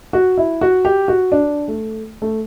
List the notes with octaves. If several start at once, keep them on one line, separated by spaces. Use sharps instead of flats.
F#4
E4
F#4
G4
F#4
D4
A3
A3